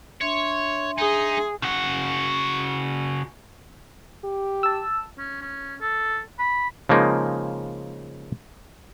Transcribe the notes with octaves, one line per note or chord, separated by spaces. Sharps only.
D4 C#5 E5 C6
D#4 G#4
C#3 F#4
G4
A5 E6
C#4
C#4
A4
B5
C#3 F3 G#3 A#3 D#4